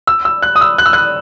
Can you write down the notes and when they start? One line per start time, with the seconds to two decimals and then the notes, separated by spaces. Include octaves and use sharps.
0.07 E6
0.25 E6
0.42 F#6
0.56 D#6
0.61 E6
0.78 F#6
0.86 E6
0.93 F#6